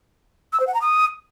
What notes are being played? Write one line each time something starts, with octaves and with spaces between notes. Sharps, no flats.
E6
C5
F#5
A#5
D#6